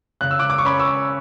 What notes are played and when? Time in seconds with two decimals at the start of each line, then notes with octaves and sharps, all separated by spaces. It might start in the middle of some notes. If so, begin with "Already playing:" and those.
0.21 C#3 F#6
0.31 E6
0.39 D6 F#6
0.50 D6
0.58 C#6
0.65 C#4 B5 D6
0.79 C#6 E6